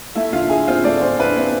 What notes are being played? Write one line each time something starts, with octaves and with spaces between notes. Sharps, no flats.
A3 E4 E5
D3 F4 F5
E4 G#4 G#5
C4 F4 F5
A3 D4 D5
D3 C5
E4 B4
C4 C5